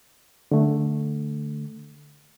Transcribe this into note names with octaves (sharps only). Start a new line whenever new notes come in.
D3 A3